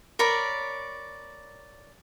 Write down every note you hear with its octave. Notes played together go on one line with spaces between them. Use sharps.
A#4 C#5 D5 B5